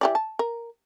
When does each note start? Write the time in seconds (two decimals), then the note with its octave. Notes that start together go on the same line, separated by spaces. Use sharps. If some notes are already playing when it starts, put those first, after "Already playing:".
0.01 E3 G4 D5
0.15 A5
0.39 A#4